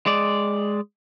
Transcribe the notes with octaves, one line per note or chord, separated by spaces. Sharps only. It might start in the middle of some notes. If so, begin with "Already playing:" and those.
G#3 D5